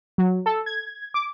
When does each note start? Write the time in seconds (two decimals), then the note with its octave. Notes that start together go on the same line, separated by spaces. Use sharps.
0.18 F#3
0.46 A4
0.66 G#6
1.14 D6